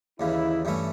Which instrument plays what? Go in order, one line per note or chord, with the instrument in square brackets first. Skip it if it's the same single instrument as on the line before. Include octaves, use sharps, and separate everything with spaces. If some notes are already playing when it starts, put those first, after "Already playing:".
[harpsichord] D#2 C#3 E3 [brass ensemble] E4
[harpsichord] G2 E3 A3 C#4 E4